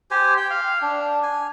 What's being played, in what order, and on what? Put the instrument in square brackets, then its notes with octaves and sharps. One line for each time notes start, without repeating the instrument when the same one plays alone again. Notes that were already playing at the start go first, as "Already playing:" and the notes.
[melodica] G4 C5 G#5
G5
F5
D4
G#5